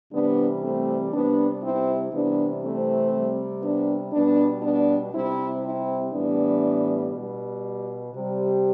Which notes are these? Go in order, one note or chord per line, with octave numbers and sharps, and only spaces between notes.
C3 E3 G3 B3 D4
A3 C4
C3 G3 B3 D4
C4 E4
C3 E3 G3 B3 D4
A3 C4
C3 G3
B3 D4
B2 G3 B3 D4
B3 D4
C3 G3 C4 E4
C4 E4
A2 E3 G3 B3 D4
B2 G3
C3 G3